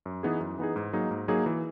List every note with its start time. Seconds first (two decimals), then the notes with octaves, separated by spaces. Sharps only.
0.06 F#2
0.23 E3 B3 D#4 G#4
0.41 F#2
0.58 E3 B3 D#4 G#4
0.76 G#2
0.93 F#3 A#3 D#4 G#4
1.11 G#2
1.28 F#3 A#3 D#4 G#4
1.46 E3